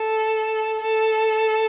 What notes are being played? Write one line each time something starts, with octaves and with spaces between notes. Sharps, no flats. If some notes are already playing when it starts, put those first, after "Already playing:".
Already playing: A4
A4